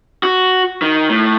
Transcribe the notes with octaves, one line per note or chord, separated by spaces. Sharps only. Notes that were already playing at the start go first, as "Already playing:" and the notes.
F#4
D#3
A2